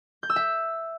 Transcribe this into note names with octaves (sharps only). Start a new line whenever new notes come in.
G6
E6
E5